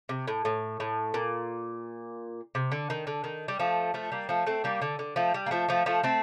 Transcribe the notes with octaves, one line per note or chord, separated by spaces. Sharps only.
C3
A2
A2
A2
A#2
C3
D3
D#3
D3
D#3
G3
F3 A3
F3 A3
G3 A#3
F3 A3
A3 C4
G3 A#3
D3
D3
F3 A3
G3
A#3
F3 A3
F3 A3
F3 A3
A3 C4